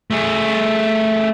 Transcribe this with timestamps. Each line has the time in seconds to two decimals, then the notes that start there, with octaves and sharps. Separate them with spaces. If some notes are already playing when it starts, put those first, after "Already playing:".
0.11 A3 G#4